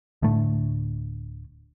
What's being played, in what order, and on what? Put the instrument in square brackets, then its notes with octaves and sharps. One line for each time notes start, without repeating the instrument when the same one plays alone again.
[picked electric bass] D1 D2 A2 A3